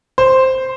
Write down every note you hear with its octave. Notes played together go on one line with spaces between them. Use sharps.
C5